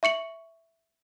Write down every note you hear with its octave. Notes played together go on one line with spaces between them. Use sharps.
E5 C#6 C#7 F#7